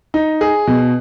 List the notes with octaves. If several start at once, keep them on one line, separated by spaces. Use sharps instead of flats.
D#4
G#4
B2